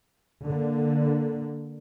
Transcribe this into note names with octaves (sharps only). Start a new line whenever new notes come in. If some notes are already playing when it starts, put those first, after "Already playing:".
D3 A#3